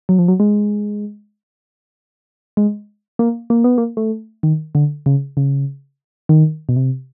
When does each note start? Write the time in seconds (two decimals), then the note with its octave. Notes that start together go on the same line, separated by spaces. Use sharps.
0.09 F#3
0.19 F3
0.28 F#3
0.40 G#3
2.57 G#3
3.19 A#3
3.50 A#3
3.64 B3
3.78 A#3
3.97 A3
4.43 D#3
4.75 D3
5.06 C#3
5.37 C#3
6.29 D#3
6.69 B2
6.76 C3